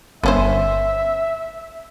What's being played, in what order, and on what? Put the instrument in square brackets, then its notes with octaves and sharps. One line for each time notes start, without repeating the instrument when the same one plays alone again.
[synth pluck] G1 [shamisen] B3 C#4 C5 [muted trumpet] E5